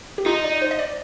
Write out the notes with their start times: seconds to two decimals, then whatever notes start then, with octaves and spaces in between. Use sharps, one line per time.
0.18 G4
0.26 D#4 F4
0.44 D5
0.62 C5
0.71 D#5
0.79 D5